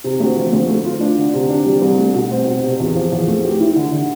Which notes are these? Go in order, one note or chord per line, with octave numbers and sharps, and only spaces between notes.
C3
D2
F3
D2
A3
F4
D4
D3
C3
D4
G3
C2
A3
B2
C4
B2
C3
E2
F3
E2
A3
G4
E4
D3
D3